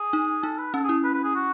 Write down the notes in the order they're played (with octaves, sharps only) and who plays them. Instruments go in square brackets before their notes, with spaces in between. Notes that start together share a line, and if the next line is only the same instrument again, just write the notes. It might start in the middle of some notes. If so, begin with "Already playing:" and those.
Already playing: [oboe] G#4
[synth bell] D#4
[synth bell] D#4 [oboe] A4
[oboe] B4
[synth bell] C#4 [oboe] A4
[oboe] G#4
[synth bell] E4
[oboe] B4
B4
G#4
F#4